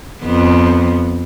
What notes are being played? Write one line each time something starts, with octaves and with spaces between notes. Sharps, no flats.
F2 B3